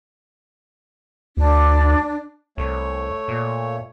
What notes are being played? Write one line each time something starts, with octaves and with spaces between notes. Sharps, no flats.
D2 D4
C2 A3 C#5
A#2